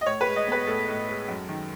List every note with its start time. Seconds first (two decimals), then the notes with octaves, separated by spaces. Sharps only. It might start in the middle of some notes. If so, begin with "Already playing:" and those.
0.01 D#5
0.05 A2 C#5
0.21 B4
0.27 G#3
0.36 D#5
0.47 B3 B4
0.67 A2 A4
0.88 A2
1.09 G#3
1.28 F#2
1.49 D#3